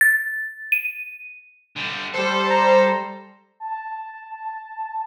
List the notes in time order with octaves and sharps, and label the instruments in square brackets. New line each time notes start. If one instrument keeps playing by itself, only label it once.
[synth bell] A6
D#7
[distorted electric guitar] D3 G3
[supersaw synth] G3 C5 [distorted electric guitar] A4
[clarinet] A#5
[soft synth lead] A5